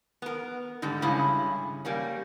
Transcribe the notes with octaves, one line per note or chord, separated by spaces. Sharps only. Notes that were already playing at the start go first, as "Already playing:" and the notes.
B3 A#4
G#2 D3 G3
G2 C#3 G#3 C#4 E4
G3 A#3 C#4